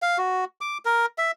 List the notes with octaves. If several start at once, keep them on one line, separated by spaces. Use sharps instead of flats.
F5
F#4
D6
A#4
E5